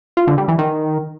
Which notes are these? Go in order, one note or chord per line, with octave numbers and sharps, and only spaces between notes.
F4
D3
G3
E3
D#3